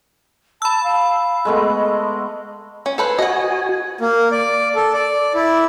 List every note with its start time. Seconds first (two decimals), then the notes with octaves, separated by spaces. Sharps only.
0.62 A5 B5 E6
0.84 F5
1.45 G#3 A3 B3 D#5
2.86 C#4
2.98 A4 B4 C5
3.19 F#4 D#5 F#5 G#5
4.01 A#3
4.31 D5
4.75 A4
4.94 D5
5.35 E4